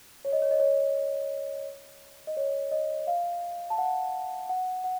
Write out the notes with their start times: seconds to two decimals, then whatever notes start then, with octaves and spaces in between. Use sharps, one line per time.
0.25 C#5
0.33 D#5
0.42 C#5
0.51 D#5
0.60 C#5
2.27 D#5
2.37 C#5
2.71 D#5
3.07 F5
3.70 A5
3.78 F#5
4.49 F#5
4.84 F#5